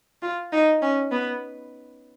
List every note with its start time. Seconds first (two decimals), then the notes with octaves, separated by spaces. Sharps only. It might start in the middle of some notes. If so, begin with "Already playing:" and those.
0.22 F4
0.52 D#4
0.82 C#4
1.11 B3